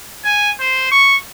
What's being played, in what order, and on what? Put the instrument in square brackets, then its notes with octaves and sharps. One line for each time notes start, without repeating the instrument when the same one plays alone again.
[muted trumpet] G#5
C5
C#6